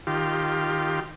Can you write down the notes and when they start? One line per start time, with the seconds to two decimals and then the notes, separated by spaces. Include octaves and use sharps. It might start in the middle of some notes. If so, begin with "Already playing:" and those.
0.07 D#3 F4 G4